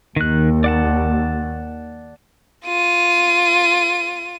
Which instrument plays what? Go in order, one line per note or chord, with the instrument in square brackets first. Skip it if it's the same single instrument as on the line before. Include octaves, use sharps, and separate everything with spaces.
[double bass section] D#2 [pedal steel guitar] D#3 F#6
[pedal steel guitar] D5 F#5 A5
[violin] F4 D#7